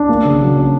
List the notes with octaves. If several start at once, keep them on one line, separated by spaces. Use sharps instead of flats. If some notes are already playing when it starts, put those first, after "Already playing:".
Already playing: D4
A#3
C#3
F#3
C#4